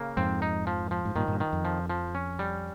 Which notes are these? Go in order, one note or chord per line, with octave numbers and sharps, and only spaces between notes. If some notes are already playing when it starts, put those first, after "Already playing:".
Already playing: C#3 A#3
F2 G#2 C4
D#4
F3
F3
G#2
G2 A#2 D#3
G2 A#2
D#3
F2
F3
F3
C#4
G3